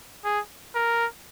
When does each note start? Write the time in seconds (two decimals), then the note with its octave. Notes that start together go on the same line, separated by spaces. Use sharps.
0.24 G#4
0.75 A#4